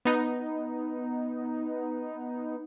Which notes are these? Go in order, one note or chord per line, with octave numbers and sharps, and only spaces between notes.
B3 D#4